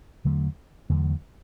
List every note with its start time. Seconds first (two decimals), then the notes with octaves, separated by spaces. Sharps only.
0.25 E2 D3 F#3 A3
0.90 E2 D3 F#3 A3